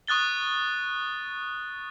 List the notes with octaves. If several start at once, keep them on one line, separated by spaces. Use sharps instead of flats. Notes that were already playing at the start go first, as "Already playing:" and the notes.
C#6 D#6 F#6 A6 G7